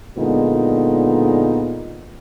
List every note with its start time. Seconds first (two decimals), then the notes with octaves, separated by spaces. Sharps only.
0.17 A#2 D3 G#3 B3 D#4 F4